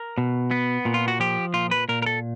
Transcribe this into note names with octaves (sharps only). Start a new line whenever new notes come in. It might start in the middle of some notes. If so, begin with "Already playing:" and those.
Already playing: A#4
B2
B3
A#2
F4
F#4
F3 G4
A#2 F4
B4
A#2 A#4
A#4
A4